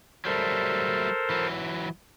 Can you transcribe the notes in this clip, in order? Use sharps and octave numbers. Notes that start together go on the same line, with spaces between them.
F#3 G3 A3 A4 A#4 C5
E3 F#3